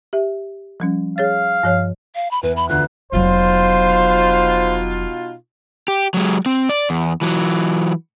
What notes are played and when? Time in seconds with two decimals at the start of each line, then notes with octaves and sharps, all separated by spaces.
0.13 G4 E5
0.80 F3 G3 C#4
1.18 G#4 C#5 F5 A6
1.63 G2 F3 C#5
2.15 F5
2.31 B5
2.43 E2 B4
2.57 B5
2.69 D2 F4 B4 F#6
3.12 F1 B2 F#3 D#4 F4 C5
5.88 G4
6.14 F#3 G#3
6.46 C4
6.69 D5
6.90 E2
7.21 E3 F#3